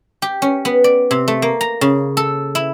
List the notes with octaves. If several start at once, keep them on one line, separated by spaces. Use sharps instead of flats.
G4
C#4
B3
D5
C3
A3
A#3
A#5
C#3
A4
E4